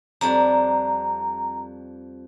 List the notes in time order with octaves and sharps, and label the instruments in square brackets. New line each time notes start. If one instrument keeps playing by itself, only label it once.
[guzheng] F2 G3 D4 [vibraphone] A#5